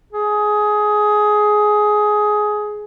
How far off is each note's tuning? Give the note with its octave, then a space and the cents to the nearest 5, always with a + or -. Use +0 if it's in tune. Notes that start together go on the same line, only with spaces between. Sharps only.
G#4 +15